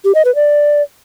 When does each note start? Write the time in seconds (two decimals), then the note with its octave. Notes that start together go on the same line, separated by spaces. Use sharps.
0.05 G4
0.15 D#5
0.25 B4
0.35 D5